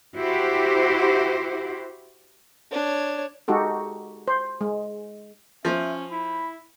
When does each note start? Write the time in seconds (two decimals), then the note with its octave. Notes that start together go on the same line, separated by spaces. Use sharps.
0.16 E4 F#4 G4 C5
2.72 D4 C#5
3.48 G#3 D#4 F#4 G4 A4
4.28 C5
4.61 G#3
5.65 F3 C#4 E5
6.12 E4 B5